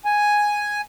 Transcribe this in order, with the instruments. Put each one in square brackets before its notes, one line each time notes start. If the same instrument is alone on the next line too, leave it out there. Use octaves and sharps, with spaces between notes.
[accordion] G#5